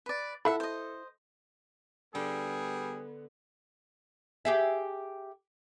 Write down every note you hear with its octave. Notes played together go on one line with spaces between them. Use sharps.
B4 D5
E4 A4 E5 F#5 B5
C5 D#5
D3 G3 B3 G#4
G4 G#4 E5